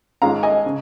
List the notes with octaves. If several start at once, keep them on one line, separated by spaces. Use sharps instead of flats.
G#1 G#2 G#3 C#4 F4 F5 A#5
D#5 G#5
C#3